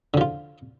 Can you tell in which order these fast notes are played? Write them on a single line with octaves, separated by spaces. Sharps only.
D3 F3 F4